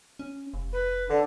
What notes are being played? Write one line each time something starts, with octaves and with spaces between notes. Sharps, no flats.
C#4
F1
B4
D3 D4